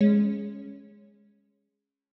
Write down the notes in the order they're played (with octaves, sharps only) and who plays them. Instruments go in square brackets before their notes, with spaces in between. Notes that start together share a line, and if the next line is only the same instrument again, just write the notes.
[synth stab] G#3 C#4